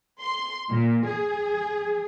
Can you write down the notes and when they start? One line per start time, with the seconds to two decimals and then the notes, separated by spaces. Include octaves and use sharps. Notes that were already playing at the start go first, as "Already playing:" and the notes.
0.21 C6
0.71 A#2
1.06 G#4